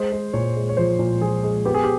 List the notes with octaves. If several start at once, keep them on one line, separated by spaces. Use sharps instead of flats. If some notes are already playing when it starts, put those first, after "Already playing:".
Already playing: G#3 C5
G#3
A#2 C#5
G#3
C#5
F3 C5
A#2
F3 G#4
G#3
B3 G4
G#4
G4